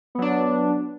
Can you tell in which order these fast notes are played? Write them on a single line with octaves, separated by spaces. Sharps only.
B3 F#3 D4